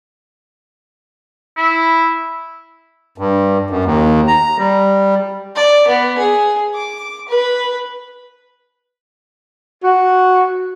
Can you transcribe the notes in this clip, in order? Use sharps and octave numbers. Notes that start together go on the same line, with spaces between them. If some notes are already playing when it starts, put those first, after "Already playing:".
E4
G2
F#2
D#2
A#5
G3
D5
B3
G#4
D6
B4
F#4